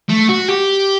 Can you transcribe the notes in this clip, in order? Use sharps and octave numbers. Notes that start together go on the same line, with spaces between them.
A3
F#4
G4